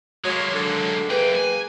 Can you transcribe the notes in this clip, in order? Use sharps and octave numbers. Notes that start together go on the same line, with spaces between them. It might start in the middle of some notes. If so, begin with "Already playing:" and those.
F#3 G#3 A#3 C#5
D3 F#3
F#2 A#3 G#4 B4 G5
G#5